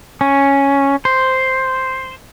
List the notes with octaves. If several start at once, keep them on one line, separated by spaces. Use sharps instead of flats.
C#4
C5